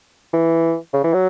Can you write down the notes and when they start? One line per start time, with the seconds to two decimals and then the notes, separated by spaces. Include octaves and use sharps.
0.34 E3
0.94 C#3
1.04 E3
1.14 F#3